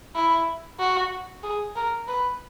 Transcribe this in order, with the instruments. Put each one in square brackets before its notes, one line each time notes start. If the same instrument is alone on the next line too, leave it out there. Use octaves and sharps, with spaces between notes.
[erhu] E4
F#4
G#4
A#4
B4